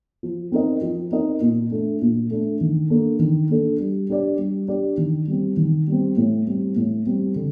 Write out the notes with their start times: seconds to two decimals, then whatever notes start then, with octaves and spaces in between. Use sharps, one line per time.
0.23 F3
0.52 C4 D#4 A#4 D#5
0.82 F3
1.11 C4 D#4 A#4 D#5
1.41 A#2
1.71 A3 D4
2.02 A#2
2.31 A3 D4
2.61 D#3
2.90 A#3 D4 A4
3.19 D#3
3.49 A#3 D4 A4
3.80 G3
4.09 D4 G4 D5
4.38 G3
4.68 D4 G4 D5
4.97 D#3
5.27 G3 C4
5.57 D#3
5.87 G3 C4
6.17 A2
6.47 G3 C4
6.76 A2
7.07 G3 C4
7.36 D3